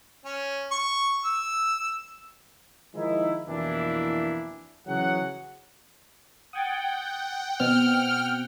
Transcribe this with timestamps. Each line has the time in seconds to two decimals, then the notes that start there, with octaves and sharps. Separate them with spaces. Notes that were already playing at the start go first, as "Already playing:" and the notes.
0.24 C#4
0.71 C#6
1.24 E6
2.95 D#3 F3 G#3 D#4 E4
3.48 F2 B2 E3 A#3 D4 E4
4.87 C#3 E3 F#3 G#4 F#5
6.53 F#5 G5 D#6 G#6 A6
7.60 B2 C4 F6